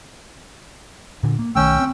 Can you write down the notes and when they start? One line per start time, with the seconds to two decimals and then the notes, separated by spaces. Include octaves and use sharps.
1.23 A#2 D3
1.39 A#3
1.56 B1 D#3 A3 C#4 G5 E6
1.79 C4